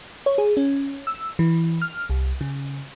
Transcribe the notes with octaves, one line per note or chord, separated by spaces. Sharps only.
C#5
G#4
C#4
E6
E3
F6
C2
C#3